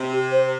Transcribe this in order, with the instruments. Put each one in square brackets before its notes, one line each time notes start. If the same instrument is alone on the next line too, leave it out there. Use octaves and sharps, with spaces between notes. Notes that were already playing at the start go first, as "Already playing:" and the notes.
Already playing: [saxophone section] C3
[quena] G4
C5